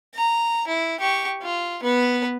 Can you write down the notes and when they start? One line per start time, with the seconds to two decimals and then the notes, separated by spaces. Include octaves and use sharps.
0.15 A#5
0.68 E4
1.00 G4 C#6
1.43 F4
1.83 B3 B4